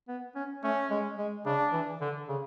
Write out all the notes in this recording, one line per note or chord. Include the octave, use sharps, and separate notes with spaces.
B3
C#4
A3 C#4
G#3
G#3
C#3 D4
E3
D3
C#3